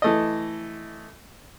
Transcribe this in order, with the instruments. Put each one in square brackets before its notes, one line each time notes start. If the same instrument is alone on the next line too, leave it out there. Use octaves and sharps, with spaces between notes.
[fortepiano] E3 A3 D#5